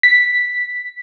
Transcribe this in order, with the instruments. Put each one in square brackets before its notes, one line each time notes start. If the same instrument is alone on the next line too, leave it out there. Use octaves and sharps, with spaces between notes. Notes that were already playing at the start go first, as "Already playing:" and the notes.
[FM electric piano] B6